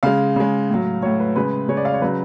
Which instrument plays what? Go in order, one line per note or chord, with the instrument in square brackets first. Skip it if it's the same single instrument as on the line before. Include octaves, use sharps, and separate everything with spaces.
[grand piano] C#3 G#3 F5
C#3 G#3
A2 F#3
A2 F#3 C#5
B4
C#3 G#3 B4
C#3 G#3 C#5
D5
F5
C#5
C#3 F#3 B4